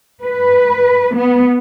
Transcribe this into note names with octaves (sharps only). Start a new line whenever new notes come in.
B4
B3